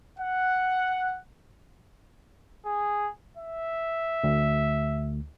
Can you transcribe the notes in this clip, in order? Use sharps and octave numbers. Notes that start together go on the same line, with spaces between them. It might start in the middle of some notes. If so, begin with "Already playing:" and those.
F#5
G#4
E5
D2